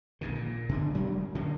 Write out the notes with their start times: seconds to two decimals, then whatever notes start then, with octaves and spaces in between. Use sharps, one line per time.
0.21 A#1 D#2 G#2 D3
0.35 A#2
0.69 B2 D3 D4
0.94 E1 F#3 G#3 D4
1.35 D3 F#3 A#3 C#4